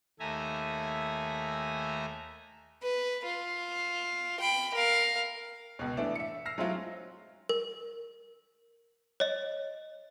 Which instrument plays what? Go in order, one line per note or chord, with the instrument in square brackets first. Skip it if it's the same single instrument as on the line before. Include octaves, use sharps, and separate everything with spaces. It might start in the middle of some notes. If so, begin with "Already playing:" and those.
[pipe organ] D#2 A3 E5 G#5 A#5
[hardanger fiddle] B4
F4
G5 B5
A#4 F5
[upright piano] C#2 B2
E3 A3 B3 D4
E5 C#7
E6 F6 A#6 C7
F#3 G#3 A3 C4 E4 F4
[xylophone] A#4
C#5 D#5